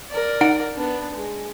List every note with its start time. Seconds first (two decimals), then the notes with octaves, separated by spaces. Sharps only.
0.10 A#4 D5
0.41 D#4 F#5 D7
0.76 B3 D4
1.14 G#3